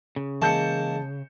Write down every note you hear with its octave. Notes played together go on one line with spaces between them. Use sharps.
C#3
E3 G#3 A#3 E4 A5 G6 C#7